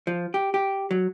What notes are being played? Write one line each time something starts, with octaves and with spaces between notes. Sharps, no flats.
F3
G4
G4
F#3